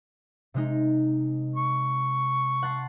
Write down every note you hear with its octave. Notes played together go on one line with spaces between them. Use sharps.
C3 G#3 D#4
C#6
F#5 A5 C6